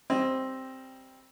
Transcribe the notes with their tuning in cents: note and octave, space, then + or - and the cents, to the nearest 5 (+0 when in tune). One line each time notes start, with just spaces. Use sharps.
G3 +0 C4 +5 D#5 +5